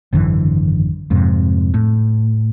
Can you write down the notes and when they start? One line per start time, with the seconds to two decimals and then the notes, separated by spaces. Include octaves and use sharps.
0.13 G#1 F#2 D3 E3
1.11 F2 G#2 C3
1.74 A2